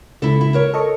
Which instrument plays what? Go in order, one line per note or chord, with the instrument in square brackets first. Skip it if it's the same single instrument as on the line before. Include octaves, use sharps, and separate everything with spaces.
[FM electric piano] C#2 [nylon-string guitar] E4 A4
[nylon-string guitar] E4
A#4 C#5
[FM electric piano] A4 D#5 C#6